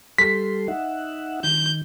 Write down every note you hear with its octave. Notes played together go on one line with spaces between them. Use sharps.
G3 A4 C6 B6
D#4 E5 F#5
D#3 G6